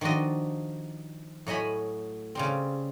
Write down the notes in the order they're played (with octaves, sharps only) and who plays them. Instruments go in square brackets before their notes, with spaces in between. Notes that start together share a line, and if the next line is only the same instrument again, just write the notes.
[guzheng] D#3 F3 D4 F#4 D#5
A2 F#3 D#5 G#5 B5
C#3 G3 C4